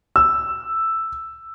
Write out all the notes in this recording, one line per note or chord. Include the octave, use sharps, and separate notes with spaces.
E6